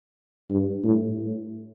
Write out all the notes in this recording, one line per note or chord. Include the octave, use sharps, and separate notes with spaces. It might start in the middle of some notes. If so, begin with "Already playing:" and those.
G2
A2